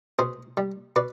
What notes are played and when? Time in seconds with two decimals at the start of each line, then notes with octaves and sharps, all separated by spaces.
0.19 B2 G#4 C5
0.57 G3
0.96 B2 B4 D5